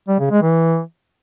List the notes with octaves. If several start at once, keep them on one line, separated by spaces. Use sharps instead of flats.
G3
C#3
G#3
E3